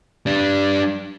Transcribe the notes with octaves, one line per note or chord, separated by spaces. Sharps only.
G3 D4